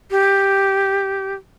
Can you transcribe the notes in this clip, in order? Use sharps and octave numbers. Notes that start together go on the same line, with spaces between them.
G4